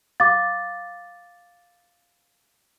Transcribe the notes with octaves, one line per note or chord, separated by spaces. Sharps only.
F5 D6 A6